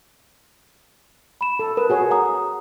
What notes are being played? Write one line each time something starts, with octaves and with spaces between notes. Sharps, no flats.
B5 E7
A4
A#4 B4
F#4 G#4 C#5
F#5 A#5 D#6